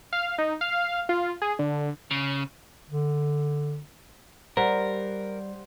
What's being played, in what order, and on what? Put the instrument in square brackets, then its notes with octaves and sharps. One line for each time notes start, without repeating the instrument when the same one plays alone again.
[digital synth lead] F5
D#4
F5
F4
G#4
D3
[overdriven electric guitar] C#3
[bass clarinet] D3
[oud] G3 [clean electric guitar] A#4 [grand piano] C5 D5 F#5